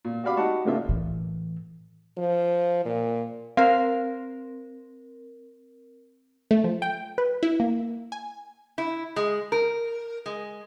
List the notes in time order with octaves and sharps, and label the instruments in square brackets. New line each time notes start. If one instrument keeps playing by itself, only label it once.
[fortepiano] A#2
F#4 G4 D5 F5 B5 D6
D#4 F#4 G4 F#5 A5 C#6
A2 C#3 A#3 D4 F4 E5
[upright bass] A2 E3
[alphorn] F3
A#2
[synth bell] C4 A#4 [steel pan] F5
[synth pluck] A3
F3
G5
B4
E4
A#3
G#5
[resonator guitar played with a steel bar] E4
G#3
A#4
G#3